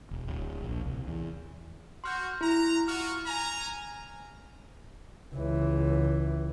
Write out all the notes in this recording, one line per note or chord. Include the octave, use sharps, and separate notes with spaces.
E1
D1
A#1
C2
E2
F#4 C6 F6 G6
E4 A#5
F4 F#4 F6
G#5 A#5
C#2 E3